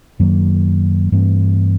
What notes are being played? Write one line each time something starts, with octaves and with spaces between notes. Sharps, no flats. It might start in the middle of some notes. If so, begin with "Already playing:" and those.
F#2 D#3 F#3 A#3
G2 E3 A3 C4